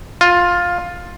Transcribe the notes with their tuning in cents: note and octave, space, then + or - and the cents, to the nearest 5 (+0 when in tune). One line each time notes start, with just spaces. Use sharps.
F4 +10